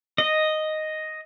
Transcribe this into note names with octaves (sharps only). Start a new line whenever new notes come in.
D#5